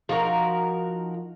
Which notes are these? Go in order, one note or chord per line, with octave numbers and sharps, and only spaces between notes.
F3 D#4 F#4 A#4